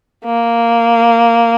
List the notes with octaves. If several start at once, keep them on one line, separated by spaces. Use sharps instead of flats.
A#3